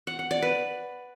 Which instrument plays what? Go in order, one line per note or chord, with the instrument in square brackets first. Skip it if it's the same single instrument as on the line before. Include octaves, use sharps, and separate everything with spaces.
[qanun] F#5
F#5
D5
B4